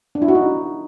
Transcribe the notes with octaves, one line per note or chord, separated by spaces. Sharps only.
D4
E4
F#4
D#4